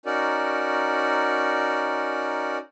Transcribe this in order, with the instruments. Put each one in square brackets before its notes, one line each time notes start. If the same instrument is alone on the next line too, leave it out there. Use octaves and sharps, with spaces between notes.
[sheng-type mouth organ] C#4 D#4 F#4 A#4 D5